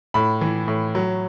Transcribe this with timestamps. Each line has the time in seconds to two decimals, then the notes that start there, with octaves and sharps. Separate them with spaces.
0.14 A2 B5
0.41 E3
0.68 A2
0.95 F#3